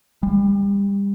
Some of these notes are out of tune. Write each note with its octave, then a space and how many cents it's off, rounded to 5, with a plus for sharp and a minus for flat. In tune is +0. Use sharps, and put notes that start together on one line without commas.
G3 +30